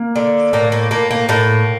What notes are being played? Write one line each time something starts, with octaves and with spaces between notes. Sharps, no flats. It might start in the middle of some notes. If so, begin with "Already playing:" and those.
Already playing: A#3
D3
A2 A#3
A#3
A2 A#3
A#3
A2 A#3